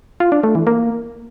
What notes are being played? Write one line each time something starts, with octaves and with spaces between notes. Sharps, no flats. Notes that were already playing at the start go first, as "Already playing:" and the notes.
F4
D4
A3
E3
A#3